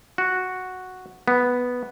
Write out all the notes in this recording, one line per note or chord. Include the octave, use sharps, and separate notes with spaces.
F#4
B3